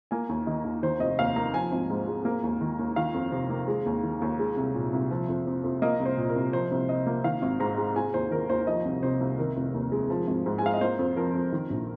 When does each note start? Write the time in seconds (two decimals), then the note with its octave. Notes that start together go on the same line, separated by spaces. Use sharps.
0.11 A#3 G#5
0.29 D#2
0.47 D#3 D#5
0.64 D#2
0.83 D#3 C5
1.00 F1 D#5
1.19 D#2 F5
1.36 A#3 A#5
1.54 F3 G#5
1.72 G#1
1.90 G#2
2.07 G#3
2.25 A#3
2.43 D#2
2.61 D#3
2.79 D#2
2.96 D#3 F5
3.14 F2
3.32 C3
3.50 A#3
3.68 G#3
3.86 D#2
4.03 D#3
4.22 D#2
4.39 G#3
4.57 C2
4.75 A#2
4.93 C2
5.11 F3
5.29 F2
5.47 C3
5.64 F2
5.82 A#3 D#5
6.00 C2
6.06 C5
6.17 A#2
6.29 A#4
6.36 C2
6.53 F3 C5
6.71 C2
6.89 C3 D#5
7.07 A#3
7.24 D#3 F5
7.42 G#1
7.60 G#2 A#5
7.78 G#3
7.96 G#3 G#5
8.14 D#2 C5
8.31 D#3 A#4
8.49 D#2 C5
8.67 F3 D#5
8.85 C2
9.03 C3 C5
9.20 C2
9.39 D#3 A#4
9.57 F1
9.74 D#2
9.92 G#3
10.10 F3
10.27 G#1
10.46 G#2
10.58 G#5
10.63 G#3 F5
10.74 D#5
10.81 A#3 C5
10.99 F2
11.17 F3 A#4
11.35 F2
11.53 D#3
11.70 A#1